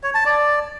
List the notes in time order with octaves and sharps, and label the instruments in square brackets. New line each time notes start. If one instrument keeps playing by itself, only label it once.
[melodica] C#5
A5
D5